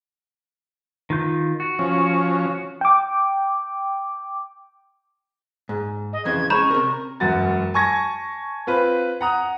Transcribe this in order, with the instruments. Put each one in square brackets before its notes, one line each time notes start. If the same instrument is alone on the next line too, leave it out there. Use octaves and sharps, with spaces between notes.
[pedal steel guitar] D#3 F4 G6
F#4
[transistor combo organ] F3 C#4
[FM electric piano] G5 D6
[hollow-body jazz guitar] G#2
[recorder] D#5
[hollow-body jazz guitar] F2 C#3 E3 [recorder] G#6
[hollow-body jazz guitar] G#3 C#4 [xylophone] A#5 B5 G6 [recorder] C#6
[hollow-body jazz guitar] C3 A#4
[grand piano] E1 F#2 F#4 A6
G#5 A5 C#6 G#6 A#6
C4 F4 B4
F#5 A#5 D#6